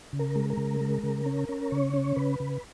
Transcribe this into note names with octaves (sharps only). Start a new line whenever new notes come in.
C#3
A#4
G#3
A#4
C#3
G#3
C#3
C#4
C#4
C#3 C#5
C#4
C#3 B4
C#3